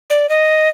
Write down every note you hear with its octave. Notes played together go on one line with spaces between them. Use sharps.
D5
D#5